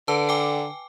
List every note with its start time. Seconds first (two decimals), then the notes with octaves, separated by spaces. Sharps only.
0.08 D3 B4 A5
0.29 G5 G#5 D6